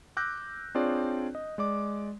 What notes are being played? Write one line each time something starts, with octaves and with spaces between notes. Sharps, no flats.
D6 E6 F#6 G6 A#6
C4 D4 F4 G#4 C#5 D5
D#5
G#3 D5 D6